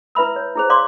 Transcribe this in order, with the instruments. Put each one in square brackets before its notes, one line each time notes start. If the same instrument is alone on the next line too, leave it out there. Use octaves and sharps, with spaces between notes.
[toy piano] E4 B4 E5 B5 E6
C#5
E4 G#4 C5
D5 F5 C6 D6